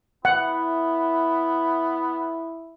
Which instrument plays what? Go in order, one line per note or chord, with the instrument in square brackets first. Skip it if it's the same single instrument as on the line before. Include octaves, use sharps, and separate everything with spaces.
[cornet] B3 [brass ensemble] E4 [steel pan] F#5